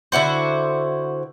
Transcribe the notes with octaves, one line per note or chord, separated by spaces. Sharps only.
D3 E4 F#4 C5